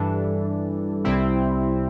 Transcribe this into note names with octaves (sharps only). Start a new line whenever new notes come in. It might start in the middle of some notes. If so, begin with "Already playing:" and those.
Already playing: G2 E3 G3 D4 A4
C2 C3 G3 C4 E4